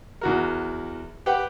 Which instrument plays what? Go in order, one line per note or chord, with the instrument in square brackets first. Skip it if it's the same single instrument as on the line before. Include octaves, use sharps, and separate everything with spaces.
[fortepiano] E2 F#4 A#4
G4 B4 F#5 G5